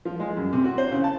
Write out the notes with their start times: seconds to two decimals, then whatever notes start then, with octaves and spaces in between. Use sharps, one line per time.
0.05 F3
0.20 G#3
0.37 F#2
0.53 C3
0.64 F#4
0.78 C5
0.92 C#3
1.04 A5